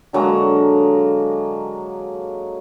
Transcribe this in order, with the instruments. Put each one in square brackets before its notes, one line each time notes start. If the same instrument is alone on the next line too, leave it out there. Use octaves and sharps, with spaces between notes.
[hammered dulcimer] D3 F#3 G#3 A#3